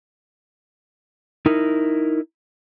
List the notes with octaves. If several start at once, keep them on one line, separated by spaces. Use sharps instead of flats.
D#4 E4 A#4